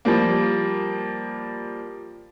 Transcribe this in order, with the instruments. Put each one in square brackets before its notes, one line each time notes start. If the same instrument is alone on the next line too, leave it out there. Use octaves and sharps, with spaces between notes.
[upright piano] F3 G3 A#3